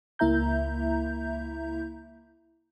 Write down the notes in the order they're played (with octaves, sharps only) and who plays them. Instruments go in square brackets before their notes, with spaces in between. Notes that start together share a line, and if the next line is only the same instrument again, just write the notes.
[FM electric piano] C#2 A#3 E4 E5 A#5 G6